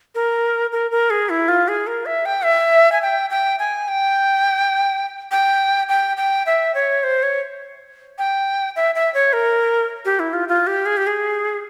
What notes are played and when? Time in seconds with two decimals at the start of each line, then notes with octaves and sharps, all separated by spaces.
0.15 A#4
0.72 A#4
0.91 A#4
1.10 G#4
1.30 E4
1.48 F4
1.68 G#4
1.87 A#4
2.06 E5
2.26 G5
2.44 E5
2.92 G#5
3.02 G5
3.30 G5
3.59 G#5
3.88 G5
5.31 G5
5.89 G5
6.17 G5
6.46 E5
6.75 C#5
7.04 C5
7.23 C#5
8.18 G5
8.76 E5
8.95 E5
9.14 C#5
9.33 A#4
10.05 G4
10.20 E4
10.33 F4
10.48 F4
10.67 G4
10.86 G#4
10.97 G4
11.07 G#4